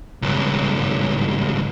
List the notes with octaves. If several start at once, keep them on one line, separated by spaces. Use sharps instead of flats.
C#2 G2